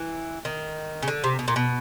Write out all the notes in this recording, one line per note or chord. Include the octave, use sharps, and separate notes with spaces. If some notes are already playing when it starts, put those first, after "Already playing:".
Already playing: E3
D#3
C#3
D3
C3
B2
A#2
B2